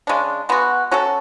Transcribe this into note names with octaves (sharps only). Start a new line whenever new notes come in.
C#3 G#3 D4
G#3 B3 F#4
F#3 C#4 F#4 A4